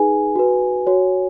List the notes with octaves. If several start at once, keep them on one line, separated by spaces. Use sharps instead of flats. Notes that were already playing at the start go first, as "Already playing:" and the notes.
Already playing: D#4 G#4 B4 G#5
F#4 B4
F#4 C#5